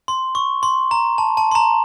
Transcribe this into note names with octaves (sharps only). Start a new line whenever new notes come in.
C6
C#6
C6
A#5
A5
A5
C6
A#5